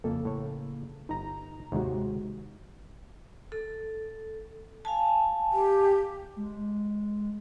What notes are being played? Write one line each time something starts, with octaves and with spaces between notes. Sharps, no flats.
F2 C#3 A#3 A4
A2 C#5
G1 D#4 A#5
D#2 G#2 C3 G#3 F#4
A4
F5 G#5 A5
G4
G#3